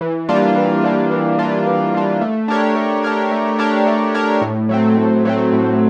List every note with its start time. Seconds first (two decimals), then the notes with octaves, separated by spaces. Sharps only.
0.01 E3
0.29 G3 A#3 D4 F4
0.56 E3
0.84 G3 A#3 D4 F4
1.11 E3
1.39 G3 A#3 D4 F4
1.66 E3
1.94 G3 A#3 D4 F4
2.21 A3
2.48 D4 G4 A#4 C#5
2.76 A3
3.03 D4 G4 A#4 C#5
3.31 A3
3.59 D4 G4 A#4 C#5
3.86 A3
4.14 D4 G4 A#4 C#5
4.41 A2
4.69 F#3 A3 C4
4.97 A2
5.25 F#3 A3 C4
5.53 A2